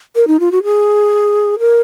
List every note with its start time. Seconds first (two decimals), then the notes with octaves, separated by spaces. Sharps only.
0.15 A#4
0.27 D#4
0.40 F4
0.52 F#4
0.63 G#4
1.59 A#4